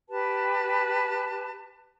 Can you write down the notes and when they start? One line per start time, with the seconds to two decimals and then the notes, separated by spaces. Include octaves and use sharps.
0.09 G4 B4 A5